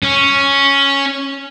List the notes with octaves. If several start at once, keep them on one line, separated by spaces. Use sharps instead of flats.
C#4